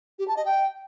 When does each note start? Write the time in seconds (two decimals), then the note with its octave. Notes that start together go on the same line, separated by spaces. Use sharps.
0.19 G4
0.28 A5
0.37 D#5
0.45 G5